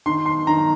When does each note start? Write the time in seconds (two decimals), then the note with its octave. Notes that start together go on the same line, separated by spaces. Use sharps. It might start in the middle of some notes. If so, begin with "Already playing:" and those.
0.06 D#3 C6
0.26 C6
0.47 D#3 A#5